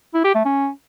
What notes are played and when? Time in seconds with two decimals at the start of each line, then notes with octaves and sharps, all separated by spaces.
0.14 E4
0.25 G4
0.35 A3
0.45 C#4